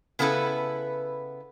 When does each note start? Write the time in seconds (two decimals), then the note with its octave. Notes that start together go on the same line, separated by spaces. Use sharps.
0.19 C#3 B3 E4 A4 B4